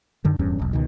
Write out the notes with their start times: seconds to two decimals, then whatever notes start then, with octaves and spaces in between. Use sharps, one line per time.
0.25 F#2 D3 D#3
0.39 D1 E2 G2 C#4
0.59 E1 B1
0.73 C#2 B2 D#3